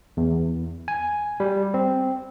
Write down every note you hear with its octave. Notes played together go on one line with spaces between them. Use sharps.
E2
G#5
G3
C4